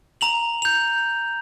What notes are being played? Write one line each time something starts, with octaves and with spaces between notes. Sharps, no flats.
A#5 F7 F#7
G6 F7